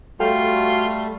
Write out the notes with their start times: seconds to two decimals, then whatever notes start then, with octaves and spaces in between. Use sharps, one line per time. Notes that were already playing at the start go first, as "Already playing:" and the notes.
0.20 G3 A3 F4 F#4 A4 G5